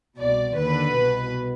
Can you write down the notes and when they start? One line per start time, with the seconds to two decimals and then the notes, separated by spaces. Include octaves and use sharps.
0.19 C2 B2 D5
0.58 D#2 D3 B4
0.96 C2 B2